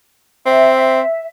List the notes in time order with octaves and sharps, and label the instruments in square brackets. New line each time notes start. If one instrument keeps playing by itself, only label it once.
[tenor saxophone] C4 [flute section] E5